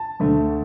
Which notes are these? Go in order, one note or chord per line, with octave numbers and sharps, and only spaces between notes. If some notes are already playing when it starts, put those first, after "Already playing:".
Already playing: A5
D2 D3 A3